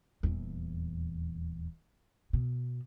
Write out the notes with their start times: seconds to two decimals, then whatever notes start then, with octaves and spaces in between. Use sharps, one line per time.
0.23 D#1 E2
2.33 B2